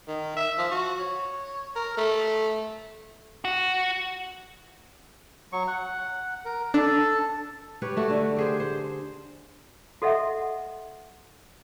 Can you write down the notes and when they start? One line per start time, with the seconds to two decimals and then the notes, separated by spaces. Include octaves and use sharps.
0.08 D#3
0.36 E5
0.58 F3
0.71 F#4
0.99 C#5
1.76 A#4
1.97 A3
3.45 F#4
5.53 F#3 C#6
5.67 F#5
6.45 A#4
6.74 D4 A4
7.82 G4 B4 C#5
7.97 A3 F#4 A4
8.10 D3
8.36 G4 G#4 C5
8.60 C5
10.02 F#4 A4 D#5 E5 F#5